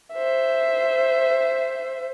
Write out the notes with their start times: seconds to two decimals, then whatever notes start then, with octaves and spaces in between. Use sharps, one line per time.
0.13 C5 E5